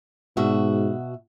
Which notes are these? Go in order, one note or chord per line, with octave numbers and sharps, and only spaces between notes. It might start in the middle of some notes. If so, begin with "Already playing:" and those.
G#2 B2 F#4 E5